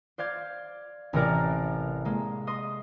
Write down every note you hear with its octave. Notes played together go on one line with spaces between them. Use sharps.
C5 D5 F5 G#6
A1 C3 A#4 D5
G#3 A#3
D#5 C6 D#6